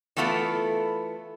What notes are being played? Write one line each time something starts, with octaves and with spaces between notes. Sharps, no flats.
E3 A3 B3 E4 F4 A4